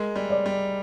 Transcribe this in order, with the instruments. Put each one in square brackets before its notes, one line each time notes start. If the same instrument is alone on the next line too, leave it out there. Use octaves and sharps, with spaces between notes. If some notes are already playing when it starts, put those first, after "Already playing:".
Already playing: [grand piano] G#3 [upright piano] A#4
[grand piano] G3
[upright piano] D5
[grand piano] G3